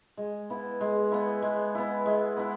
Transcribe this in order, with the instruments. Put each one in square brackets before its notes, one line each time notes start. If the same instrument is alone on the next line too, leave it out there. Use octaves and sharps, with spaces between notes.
[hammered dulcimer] G#3
B3 E4
G#3
B3 E4
G#3
B3 E4
G#3
B3 E4